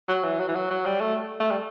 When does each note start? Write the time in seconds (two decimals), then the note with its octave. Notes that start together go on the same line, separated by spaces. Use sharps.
0.08 F#3
0.24 E3
0.40 F#3
0.48 E3
0.55 F#3
0.70 F#3
0.85 G3
1.01 A3
1.40 A3
1.51 G3